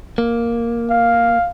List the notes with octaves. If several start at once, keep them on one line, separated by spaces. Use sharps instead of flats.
A#3
F5